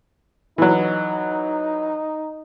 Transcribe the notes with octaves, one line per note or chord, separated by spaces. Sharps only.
E3 F#3 D#4